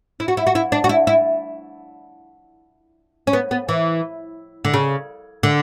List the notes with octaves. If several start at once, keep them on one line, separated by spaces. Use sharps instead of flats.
E4
F#4
E4
F#4
E4
D4
F#4
E4
E4
C#4
B3
B3
E3
D3
C#3
D3